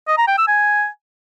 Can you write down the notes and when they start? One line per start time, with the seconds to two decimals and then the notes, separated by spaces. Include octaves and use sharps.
0.08 D#5
0.18 A#5
0.28 G5
0.38 E6
0.48 G#5